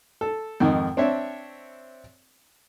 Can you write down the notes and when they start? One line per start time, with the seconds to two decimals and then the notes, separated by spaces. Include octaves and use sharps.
0.21 A4
0.60 F2 G#2 D#3
0.97 C4 D4 C#5 E5